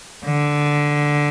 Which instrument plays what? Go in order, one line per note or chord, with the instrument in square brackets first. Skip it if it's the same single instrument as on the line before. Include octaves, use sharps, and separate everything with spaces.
[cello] D3